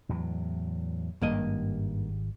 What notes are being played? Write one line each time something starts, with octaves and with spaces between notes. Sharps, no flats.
E2 A2 F#3
G#1 G2 G3 A#3 D#5